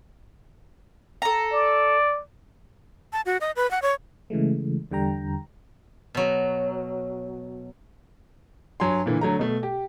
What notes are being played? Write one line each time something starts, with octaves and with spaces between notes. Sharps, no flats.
A4 A#5
D5
A5
F#4
D#5
B4
F#5
C#5
C#3 E3 G#3 A3
E2 D3 G3 G5 A#5
B2 F#3
G2 F#3 G#5 C6
A#2 D3 E3
D3 F#3 A3 A#5
B2 A3
G4